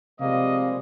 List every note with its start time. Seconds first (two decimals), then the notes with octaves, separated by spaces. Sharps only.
0.20 C3 F3 G3 G#3 A#3 D#5